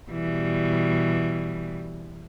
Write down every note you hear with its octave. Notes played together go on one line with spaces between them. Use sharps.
B2 E3 G3